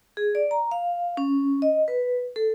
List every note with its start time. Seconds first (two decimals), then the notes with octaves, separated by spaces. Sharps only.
0.17 G#4
0.35 D5
0.51 A#5
0.71 F5
1.17 C#4
1.62 D#5
1.88 B4
2.36 A4